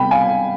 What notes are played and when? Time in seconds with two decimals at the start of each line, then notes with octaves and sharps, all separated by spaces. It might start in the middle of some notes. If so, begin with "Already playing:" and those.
Already playing: C3 G3 B3 G5 B5
0.11 F5 G#5